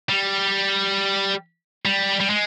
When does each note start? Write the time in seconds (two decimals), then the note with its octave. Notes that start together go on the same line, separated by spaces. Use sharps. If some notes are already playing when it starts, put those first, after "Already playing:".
0.09 G3
1.85 G3
2.20 G3
2.30 G#3